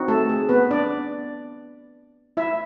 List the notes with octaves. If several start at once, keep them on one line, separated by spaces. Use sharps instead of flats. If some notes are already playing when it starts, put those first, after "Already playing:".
Already playing: C4 D#4 F#4
A3 A4
G#4
B3 B4
D4 D5
E4 E5